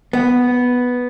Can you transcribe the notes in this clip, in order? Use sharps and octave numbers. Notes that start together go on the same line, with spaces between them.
B3